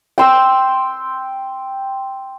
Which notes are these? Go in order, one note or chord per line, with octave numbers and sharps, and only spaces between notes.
G5 C6 E6